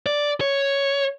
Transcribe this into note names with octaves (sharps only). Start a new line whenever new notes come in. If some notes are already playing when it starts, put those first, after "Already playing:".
D5
C#5